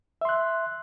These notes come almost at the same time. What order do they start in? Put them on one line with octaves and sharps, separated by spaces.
E5 C6 F#6